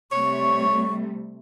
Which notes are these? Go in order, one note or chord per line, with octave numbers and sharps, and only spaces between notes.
C3 G3 A3 C#5 C#6